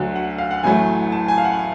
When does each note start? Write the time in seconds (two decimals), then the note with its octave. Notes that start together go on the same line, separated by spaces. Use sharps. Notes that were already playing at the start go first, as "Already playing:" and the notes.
Already playing: D2 D3 F#3
0.16 F#5
0.38 F5
0.51 F#5
0.63 A1 A2 F#3 A3 G#5
1.12 A5
1.28 G#5
1.38 F5
1.45 F#5